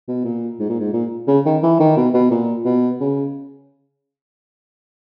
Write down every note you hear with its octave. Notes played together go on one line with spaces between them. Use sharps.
B2
A#2
G#2
A#2
G#2
A#2
C#3
D#3
E3
D#3
B2
B2
A#2
B2
C#3